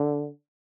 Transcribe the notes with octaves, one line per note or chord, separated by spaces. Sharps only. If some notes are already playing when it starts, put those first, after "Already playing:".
Already playing: D3